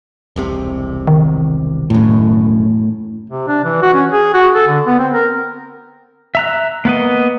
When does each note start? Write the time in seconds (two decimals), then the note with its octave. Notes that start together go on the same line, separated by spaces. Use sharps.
0.36 E1 C2 C3
1.07 D#3
1.90 E1 F#2 A2
3.30 C3
3.47 D4
3.64 E3
3.82 F#4
3.94 C#4
4.12 G#4
4.34 F#4
4.54 A4
4.67 D3
4.86 B3
4.99 C4
5.14 A#4
6.35 E5 A#5 F#6
6.85 A#3 B3 B4 D#5